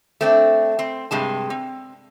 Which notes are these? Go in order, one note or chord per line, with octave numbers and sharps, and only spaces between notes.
A3 C4 D4
C4
G2 C3 G#3 A5
C4